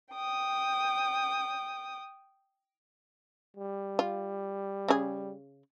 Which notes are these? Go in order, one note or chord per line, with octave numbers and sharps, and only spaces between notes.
G5 D#6
G3
F4
C#3 G#4